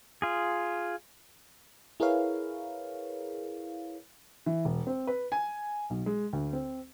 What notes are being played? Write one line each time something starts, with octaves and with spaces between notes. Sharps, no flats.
F4 G#4
E4 G#4 A#4 B4 C#5 F5
E3
E1
C4
B4
G#5
B1
G#3
D2
C4